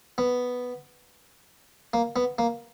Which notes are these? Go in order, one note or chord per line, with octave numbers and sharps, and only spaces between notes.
B3
A#3
B3
A#3